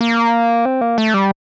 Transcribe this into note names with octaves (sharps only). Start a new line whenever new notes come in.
A#3
C4
A#3
A3
G3